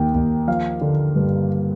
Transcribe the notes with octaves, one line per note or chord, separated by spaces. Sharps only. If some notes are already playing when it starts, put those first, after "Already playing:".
Already playing: D#2 D#3 G5
D#2
F3 F5
D3
G2